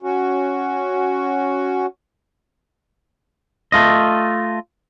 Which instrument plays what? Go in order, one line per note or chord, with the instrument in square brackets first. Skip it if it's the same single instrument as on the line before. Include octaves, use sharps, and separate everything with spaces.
[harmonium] C#4 F#4
[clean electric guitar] A3 F4 D#5